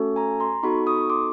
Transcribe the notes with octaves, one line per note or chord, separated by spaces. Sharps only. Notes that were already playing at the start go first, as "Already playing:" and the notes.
Already playing: A3 C#4 F#4 A4
G#5 A#5
A#5 C6
B3 D#4 F#4 A4 B5 C#6
C#6 D#6
C6 D6